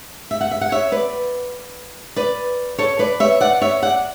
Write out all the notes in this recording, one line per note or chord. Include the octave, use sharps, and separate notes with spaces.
E5
F#5
E5
F#5
C#5 E5
B4 D5
B4 D5
A4 C#5
B4 D5
C#5 E5
D5 F#5
C#5 E5
D5 F#5